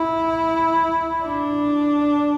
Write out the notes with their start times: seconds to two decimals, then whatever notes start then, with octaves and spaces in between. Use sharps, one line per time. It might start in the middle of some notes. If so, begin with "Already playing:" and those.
Already playing: E4
1.24 D4